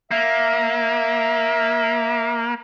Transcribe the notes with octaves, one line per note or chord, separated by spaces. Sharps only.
A#3 E5